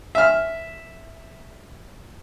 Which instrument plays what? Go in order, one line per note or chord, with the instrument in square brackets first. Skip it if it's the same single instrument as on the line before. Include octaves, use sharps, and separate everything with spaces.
[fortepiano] E5 F6